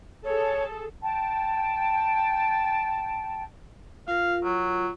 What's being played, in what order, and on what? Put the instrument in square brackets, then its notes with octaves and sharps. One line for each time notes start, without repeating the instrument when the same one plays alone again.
[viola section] G#4 A4 A5 [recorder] C#5
[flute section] G5 A5
[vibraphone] F4 A#4 [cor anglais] F5
[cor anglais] F#3